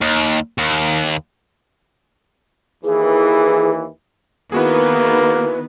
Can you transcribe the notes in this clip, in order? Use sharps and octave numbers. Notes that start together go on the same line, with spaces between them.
D#2
D#2
D#2 E3 G#4
D#3 A#3 B3 E4 F#4 G#4 B4